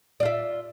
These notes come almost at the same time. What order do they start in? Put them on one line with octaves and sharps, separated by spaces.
D5 F4 E5